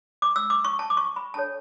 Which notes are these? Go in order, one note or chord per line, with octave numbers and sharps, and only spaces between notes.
D6
E6
D6
C#6
A5
D6
C#6
B5
D4 A4 C#5 A5